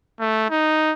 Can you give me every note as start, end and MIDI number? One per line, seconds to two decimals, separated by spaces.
0.20 0.47 57
0.50 0.93 63